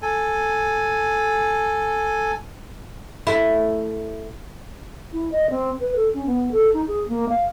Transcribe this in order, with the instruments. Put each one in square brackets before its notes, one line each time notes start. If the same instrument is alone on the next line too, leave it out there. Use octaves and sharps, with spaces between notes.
[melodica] A4 G#5
[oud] A3 E4
[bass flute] E4
D#5
C4
B4
A4
C#4
B3
A4
D#4
G#4
A#3
F5